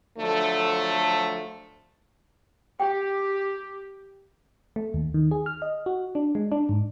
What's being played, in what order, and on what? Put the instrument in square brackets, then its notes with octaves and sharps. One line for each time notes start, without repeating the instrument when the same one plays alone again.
[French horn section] D3 F3 F#3 A3
[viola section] G4 [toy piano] G5
[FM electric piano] A3
D#2
D#3
G#4
F6
D#5
F#4
D4
G#3
D4
G#2